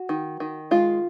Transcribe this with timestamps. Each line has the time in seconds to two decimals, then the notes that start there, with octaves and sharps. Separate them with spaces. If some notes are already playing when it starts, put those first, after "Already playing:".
Already playing: F#4
0.09 D#3
0.40 D#3
0.71 G#3 F4